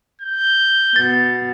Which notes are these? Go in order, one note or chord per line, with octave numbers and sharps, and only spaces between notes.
G6
B2 A6